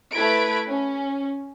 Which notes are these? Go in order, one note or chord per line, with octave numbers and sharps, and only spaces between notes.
A3 E4 B4 G#6 B6 D7
C#4